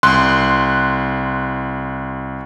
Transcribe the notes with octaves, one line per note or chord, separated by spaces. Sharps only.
C2 C6 F#6